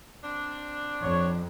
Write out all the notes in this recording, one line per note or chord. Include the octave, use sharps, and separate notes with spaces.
C4 D4
F2 C#5